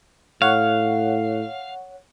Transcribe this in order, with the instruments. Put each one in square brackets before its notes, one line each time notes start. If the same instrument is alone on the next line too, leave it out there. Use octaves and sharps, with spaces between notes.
[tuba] A2 [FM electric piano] C#5 F#5 [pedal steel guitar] F5